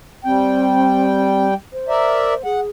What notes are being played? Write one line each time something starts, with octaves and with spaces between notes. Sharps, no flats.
G3 C4 G5
C5
A#4 D5 E5
G#4 F#5